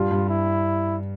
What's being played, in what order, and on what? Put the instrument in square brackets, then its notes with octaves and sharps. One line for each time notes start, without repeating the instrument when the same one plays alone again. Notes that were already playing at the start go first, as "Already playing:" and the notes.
Already playing: [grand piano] G2 G3 [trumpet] F4
[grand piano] G2 G3
[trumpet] E4